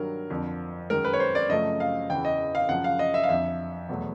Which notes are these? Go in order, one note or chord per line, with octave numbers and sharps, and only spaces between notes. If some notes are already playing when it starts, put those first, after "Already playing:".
Already playing: G2 D#3 F#3 A#4
F2 D3 F3
F#2 D#3 G#3 A#4
B4
C#5
C5
D5
F#2 C#3 F3 A3 D#5
F5
E2 C#3 E3 G5
D#5
F5
F#2 C#3 F3 F#5
F5
D#5
E5
F5
F2 D3 F3 E5
E2 B2 F#3 A3